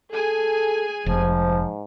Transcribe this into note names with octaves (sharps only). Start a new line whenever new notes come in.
G#4 A4 G#5
F1 G#2 F3